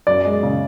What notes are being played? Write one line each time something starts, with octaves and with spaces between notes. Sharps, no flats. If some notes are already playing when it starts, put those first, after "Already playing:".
F#2 D5
G#3
C#3